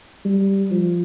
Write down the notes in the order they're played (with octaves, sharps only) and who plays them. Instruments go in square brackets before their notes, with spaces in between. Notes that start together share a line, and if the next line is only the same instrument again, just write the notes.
[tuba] G3
F3